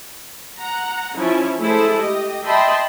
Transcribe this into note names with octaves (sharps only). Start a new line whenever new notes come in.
F#5 A#5
F3 C#4 E4
G#3 A3 E4 G#4 A4 C5
G4 D#5
D#5 E5 G5 A5 B5 C6